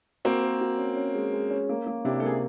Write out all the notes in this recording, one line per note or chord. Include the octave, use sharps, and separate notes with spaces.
A#3 C4 F#4
A#4
F#4
C#4
C#4
G#3
G#3
C#4
A#3
A#3
C3 D4 E4
A4
A#3 G#4